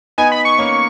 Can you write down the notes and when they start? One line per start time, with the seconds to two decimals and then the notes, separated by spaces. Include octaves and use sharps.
0.18 B3 D#4 G#5
0.32 B5
0.45 C#6
0.59 A#3 C#4